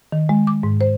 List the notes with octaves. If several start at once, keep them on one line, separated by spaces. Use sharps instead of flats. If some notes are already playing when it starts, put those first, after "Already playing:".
D#3
G#3
D6
G#2
C5